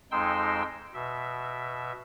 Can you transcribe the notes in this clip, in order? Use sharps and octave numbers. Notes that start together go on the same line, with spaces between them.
F2 G#3 D#4 G5 C6 E6
B2 E5